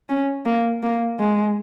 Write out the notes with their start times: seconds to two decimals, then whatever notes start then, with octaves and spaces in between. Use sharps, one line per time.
0.09 C#4
0.46 A#3
0.83 A#3
1.20 G#3